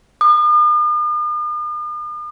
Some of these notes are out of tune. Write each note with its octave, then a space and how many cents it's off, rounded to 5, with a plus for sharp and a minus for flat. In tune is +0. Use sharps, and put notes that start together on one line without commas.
D#6 -45